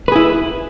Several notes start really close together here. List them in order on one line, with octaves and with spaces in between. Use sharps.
B4 G#4 E4